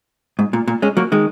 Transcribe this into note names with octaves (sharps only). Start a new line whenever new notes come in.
G#2
A#2
A#2
G#3 C#4
F#3 A#3
D#3 G#3